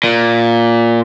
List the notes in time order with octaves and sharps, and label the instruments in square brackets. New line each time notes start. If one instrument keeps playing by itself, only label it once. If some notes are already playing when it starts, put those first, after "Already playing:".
[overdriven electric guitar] A#2